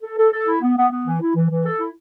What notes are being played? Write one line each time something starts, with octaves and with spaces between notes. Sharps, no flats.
A4
A4
A4
E4
B3
B3
B3
E3
E4
E3
E3
A4
E4